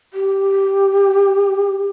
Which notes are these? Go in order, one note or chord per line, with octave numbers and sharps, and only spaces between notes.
G4